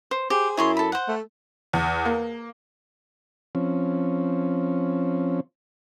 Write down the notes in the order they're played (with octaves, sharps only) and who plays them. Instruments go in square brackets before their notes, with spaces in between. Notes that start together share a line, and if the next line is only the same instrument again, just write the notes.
[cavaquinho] C5
[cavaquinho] G4 [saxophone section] G#4 C5
[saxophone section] F#2 E4 [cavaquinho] G#4 C#5 C6
[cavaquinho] A4 B5
C5 F#5
[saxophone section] A3
[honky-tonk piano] E2
A#3
[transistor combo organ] F3 C4 C#4